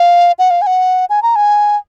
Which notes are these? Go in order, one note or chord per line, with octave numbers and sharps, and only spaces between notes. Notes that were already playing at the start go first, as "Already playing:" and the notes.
Already playing: F5
F#5
F5
G#5
F#5
G#5
A#5
G#5